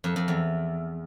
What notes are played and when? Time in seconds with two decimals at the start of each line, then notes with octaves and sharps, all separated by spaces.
0.04 F2
0.16 F2
0.28 E2